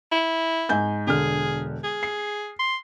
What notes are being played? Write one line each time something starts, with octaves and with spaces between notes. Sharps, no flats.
E4
G#2 G#5 G6
E1 D3 G#4 F6
G#4
C7
C6